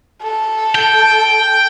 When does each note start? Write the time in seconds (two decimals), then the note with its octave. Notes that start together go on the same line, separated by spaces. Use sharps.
0.23 A4
0.75 G5